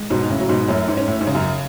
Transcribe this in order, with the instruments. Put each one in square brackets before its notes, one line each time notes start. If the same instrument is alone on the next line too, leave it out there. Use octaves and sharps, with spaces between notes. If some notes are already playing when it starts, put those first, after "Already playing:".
Already playing: [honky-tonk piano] G#3
[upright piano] G#2 B2 [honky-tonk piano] F#3
[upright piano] A2 C#3
[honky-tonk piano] F#3
[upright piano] G#2 B2
[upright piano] F#2 A2 [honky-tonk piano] C#4
[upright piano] G#2
[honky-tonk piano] C#4
[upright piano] A2
G#2
[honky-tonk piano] C#3
[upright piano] F#2